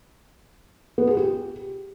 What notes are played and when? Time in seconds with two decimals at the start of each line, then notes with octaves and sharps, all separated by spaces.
0.98 B3
1.07 G#4
1.17 G4